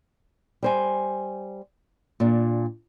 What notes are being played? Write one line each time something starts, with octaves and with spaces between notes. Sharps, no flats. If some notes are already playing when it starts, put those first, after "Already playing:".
G3 C5 G#5
A#2 D4